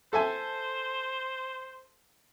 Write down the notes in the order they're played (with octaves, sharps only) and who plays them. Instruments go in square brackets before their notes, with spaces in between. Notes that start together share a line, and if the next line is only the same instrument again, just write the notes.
[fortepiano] A4 E5 G#5 [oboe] C5